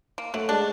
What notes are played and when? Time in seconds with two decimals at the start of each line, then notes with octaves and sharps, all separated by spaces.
0.18 A#3
0.34 F#3 A3
0.49 G#3 D4